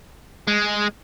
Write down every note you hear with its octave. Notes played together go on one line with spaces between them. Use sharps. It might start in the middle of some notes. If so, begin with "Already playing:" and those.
G#3